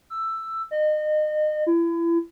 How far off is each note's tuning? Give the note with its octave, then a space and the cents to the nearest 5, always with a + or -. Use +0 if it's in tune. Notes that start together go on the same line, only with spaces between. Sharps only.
E6 +10
D#5 -30
E4 +35